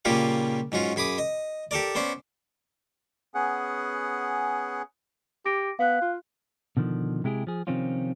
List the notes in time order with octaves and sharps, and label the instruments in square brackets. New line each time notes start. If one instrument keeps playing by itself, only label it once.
[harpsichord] A#2 C#3 G3 A#3 F4 G4
G#2 F#3 C#4 F4
F#2 G#4 B5 D6 D#6
D#5
G4 A4 A#4 D5
B3 C#4 C5 D5
[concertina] B3 C#4 G#4 F#5
[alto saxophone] G4 [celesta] D6 A#6 D7
[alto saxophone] B3 [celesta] F5 F#6
[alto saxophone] F4
[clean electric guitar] B2 D3 D#3 F3
C3 G#3 E4 G4 G#4
F3 G#4
C3 D#3 F3 C4 C#4 F4